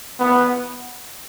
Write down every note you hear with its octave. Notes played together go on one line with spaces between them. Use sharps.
B3